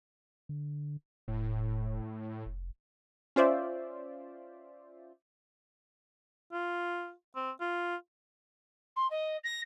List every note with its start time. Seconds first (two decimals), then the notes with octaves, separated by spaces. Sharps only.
0.49 D3
1.28 E1 A2
2.46 F1
3.36 C#4 F4 C5 D5 E5
6.52 F4
7.36 C4
7.61 F4
8.96 C6
9.10 D#5
9.44 A#6